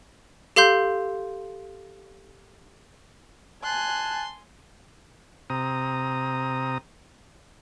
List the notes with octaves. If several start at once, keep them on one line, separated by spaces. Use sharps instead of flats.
G4 A4 F5 C6 G6
G#5 A5 C6 F#6
C3 A#5 D#6